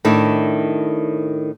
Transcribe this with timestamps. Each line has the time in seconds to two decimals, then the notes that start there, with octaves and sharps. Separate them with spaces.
0.05 A2 D#3 D4 E4